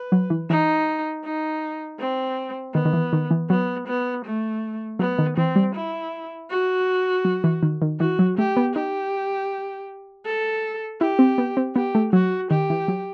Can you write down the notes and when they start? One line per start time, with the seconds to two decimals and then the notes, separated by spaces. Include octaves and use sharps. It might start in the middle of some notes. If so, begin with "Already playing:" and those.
Already playing: B4
0.12 F#3
0.30 E3
0.50 E3 D#4
1.24 D#4
1.99 C4
2.74 D#3 B3
2.85 D#3
2.93 E3
3.13 D#3
3.31 E3
3.50 F#3 B3
3.88 B3
4.25 A3
4.99 F#3 B3
5.18 D#3
5.37 E3 C4
5.56 G3
5.75 E4
6.50 F#4
7.25 F#3
7.44 E3
7.63 D#3
7.82 D#3
8.00 E3 F#4
8.19 F#3
8.38 A3 G4
8.57 B3
8.75 D#4 G4
10.26 A4
11.01 E4 G4
11.19 C4
11.38 B3
11.57 C4
11.76 B3 G4
11.95 A3
12.13 F#3 F#4
12.51 D#3 G4
12.70 E3
12.88 F#3